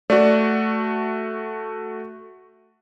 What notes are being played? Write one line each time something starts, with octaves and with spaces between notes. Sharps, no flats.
A3 F#4 D5